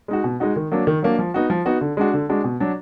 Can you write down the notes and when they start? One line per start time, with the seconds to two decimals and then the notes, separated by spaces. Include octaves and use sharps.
0.08 G#3 D#4 F#4
0.24 B2
0.40 G#3 D#4 F#4
0.56 D#3
0.72 F#3 A#3 D4
0.87 D#3
1.02 F#3 A#3 D4
1.19 F3
1.34 B3 D#4 F#4
1.50 F3
1.66 B3 D#4 F#4
1.81 D3
1.97 G#3 D4 F#4
2.13 D3
2.29 G#3 D4 F#4
2.44 B2
2.60 F#3 D4 F#4